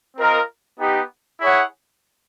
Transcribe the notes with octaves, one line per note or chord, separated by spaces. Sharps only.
C4 F4 A#4 D#5
B3 D#4 G4
E4 G#4 C#5 F#5